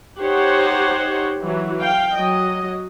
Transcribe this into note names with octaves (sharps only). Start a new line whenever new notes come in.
D#4 G4 C5 C#5 F#5
E3 F#3
F5 G5
F#3 D#5